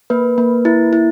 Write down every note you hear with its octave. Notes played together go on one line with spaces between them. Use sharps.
A#3 B4
A#3
E4
E4